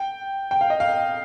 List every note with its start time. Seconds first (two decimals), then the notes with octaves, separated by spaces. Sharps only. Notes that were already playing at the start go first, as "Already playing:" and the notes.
Already playing: G5
0.51 G5
0.61 F5
0.70 D#5
0.80 F5